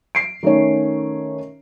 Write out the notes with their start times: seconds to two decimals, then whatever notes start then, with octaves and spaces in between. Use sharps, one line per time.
0.15 C7 D7
0.43 D#3 A3 C#4 C#5